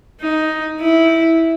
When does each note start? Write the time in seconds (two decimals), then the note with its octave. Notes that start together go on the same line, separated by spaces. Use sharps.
0.21 D#4
0.81 E4